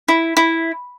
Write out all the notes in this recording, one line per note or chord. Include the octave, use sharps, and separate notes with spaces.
E4
E4